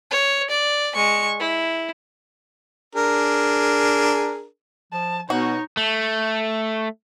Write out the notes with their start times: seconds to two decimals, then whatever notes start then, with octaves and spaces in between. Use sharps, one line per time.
0.11 C#5
0.50 D5
0.95 G#3 C#6
1.39 E4
2.95 D4 G#4 A#4
4.92 F3 A5
5.30 B2 D#4 F#4 C#5
5.77 A3